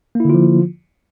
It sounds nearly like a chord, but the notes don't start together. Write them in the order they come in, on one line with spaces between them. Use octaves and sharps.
A#3 E4 D3 F4 F3